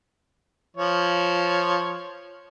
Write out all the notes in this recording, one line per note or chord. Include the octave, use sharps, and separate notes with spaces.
F3 C#5